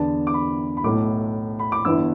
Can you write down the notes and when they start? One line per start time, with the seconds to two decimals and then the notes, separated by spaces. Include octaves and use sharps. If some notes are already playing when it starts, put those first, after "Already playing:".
Already playing: E2 D3 B3 D4 A5
0.27 D6
0.34 B5
0.77 B5
0.84 B1 A2 A3 E4 D6
1.59 B5
1.72 D6
1.85 G1 G2 E3 B3 E4 E6